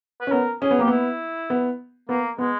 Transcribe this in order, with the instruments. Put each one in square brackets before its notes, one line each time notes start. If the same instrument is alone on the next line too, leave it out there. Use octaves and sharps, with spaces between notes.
[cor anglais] B4
[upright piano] C#4
[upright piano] B3 [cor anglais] A#4
[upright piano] C#4 [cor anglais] G#4
[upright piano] B3
[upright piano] A#3 [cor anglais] G4
[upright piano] B3 [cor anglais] E4
[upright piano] B3
[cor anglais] A#3 [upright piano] B3
[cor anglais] G#3 [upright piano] B3